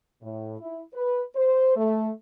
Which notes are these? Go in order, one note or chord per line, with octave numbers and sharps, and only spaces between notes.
A2
E4
B4
C5
A3